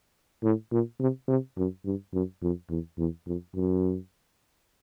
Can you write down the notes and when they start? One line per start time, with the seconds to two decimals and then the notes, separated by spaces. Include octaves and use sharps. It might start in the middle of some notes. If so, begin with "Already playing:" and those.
0.43 A2
0.71 A#2
1.00 C3
1.28 C3
1.57 F#2
1.85 G2
2.13 F#2
2.42 F2
2.70 E2
2.98 E2
3.27 F2
3.55 F#2